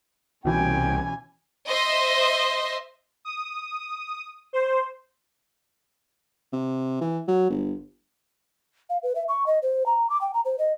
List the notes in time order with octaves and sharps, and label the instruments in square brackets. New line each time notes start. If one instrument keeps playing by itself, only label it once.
[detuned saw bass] C2 [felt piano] B2 E3 [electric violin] C#4 G#5 [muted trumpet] G5
[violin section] C5 D#5 E5 C6
[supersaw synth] D#6
C5
[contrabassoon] C3
E3
F#3
G1
[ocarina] F5
B4
E5
C#6
D#5
C5
A#5
D6
G5
A#5
C5
D#5